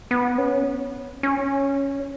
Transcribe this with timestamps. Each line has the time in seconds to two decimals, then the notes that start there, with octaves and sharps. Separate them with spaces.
0.11 B3
0.38 C#4
1.23 C#4